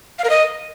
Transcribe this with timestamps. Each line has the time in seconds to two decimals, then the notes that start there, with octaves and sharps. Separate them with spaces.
0.19 F5
0.24 A#4
0.30 D#5